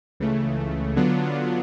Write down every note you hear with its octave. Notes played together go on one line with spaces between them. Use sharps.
C#2 C#3 E3 A3
D3 F#3 B3 D4 F4